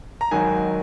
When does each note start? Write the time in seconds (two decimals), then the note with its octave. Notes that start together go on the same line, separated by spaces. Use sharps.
0.21 A#5
0.31 G#1 G#2 D#3 F#3 G#5